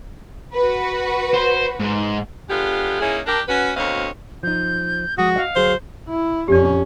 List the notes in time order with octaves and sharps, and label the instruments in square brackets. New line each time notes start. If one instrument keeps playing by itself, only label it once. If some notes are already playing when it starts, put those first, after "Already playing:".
[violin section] F#4 B4
[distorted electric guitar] C5
G#2
[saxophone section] D3 G#3 B3 F4 G4
G#3 A#3 C#4 D#4 E4 G#4
D4 G4 A#4
C#4 F#4 B4
D2 B2 C4 C#5 D#5 F5
[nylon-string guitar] F3 D#4 [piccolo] G6
[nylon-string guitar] F3 G#3 [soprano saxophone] F#4 [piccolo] D#6
[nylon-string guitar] D#5 F#5 [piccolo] F5
[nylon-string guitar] D2 F#3 G#4 [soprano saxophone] C5
[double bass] E4
[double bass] F2 C#4 [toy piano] G4 D5